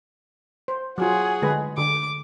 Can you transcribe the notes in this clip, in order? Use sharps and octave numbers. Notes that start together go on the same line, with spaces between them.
C5
F#3 F4 F#4 G#4
D3 G#3 B4
D3 D6